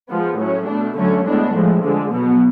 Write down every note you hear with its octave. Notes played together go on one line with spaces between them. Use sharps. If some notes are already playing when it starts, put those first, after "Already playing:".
F3 G#3 B3
A2 F#3 C#4
B2 A3 D4
D3 F#3 A3 C#4
A2 G#3 B3 D4
A2 F3 G#3
D3 F3 G#3
B2 F#3 B3